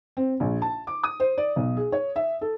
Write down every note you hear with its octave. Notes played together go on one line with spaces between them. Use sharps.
C4
A#1
A5
D6
D#6
C5
D5
B1
G#4
C#5
E5
A4